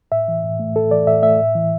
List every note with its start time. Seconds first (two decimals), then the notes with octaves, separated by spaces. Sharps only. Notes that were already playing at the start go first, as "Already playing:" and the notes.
0.12 A2 E5
0.28 E3
0.44 A2
0.59 A3
0.76 A2 A4
0.91 E3 D5
1.07 A2 E5
1.23 A3 E5
1.40 A2
1.55 E3